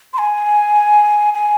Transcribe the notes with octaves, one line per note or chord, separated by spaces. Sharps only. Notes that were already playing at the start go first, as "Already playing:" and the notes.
C6
G#5
G#5